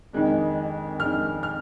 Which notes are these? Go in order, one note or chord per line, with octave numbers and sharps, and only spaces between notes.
F2 D#3 G#3 D4
F2 D#3 G#3 D4 F6
F6